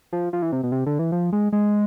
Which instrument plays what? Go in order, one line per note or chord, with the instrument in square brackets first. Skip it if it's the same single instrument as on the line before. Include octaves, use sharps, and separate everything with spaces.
[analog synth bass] F3
F3
E3
C3
B2
C3
D3
E3
F3
G#3
G#3